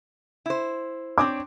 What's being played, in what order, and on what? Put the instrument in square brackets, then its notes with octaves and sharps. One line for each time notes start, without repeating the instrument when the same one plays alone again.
[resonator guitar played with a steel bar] E4 C5
[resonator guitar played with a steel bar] C4 D4 C#5 [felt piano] D6